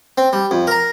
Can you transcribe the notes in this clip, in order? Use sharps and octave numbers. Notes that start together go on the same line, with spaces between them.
C4
G3
F2
A#4 A#5